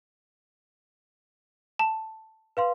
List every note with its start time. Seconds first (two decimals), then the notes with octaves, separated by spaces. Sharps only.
1.79 A5
2.57 B4 F5 C6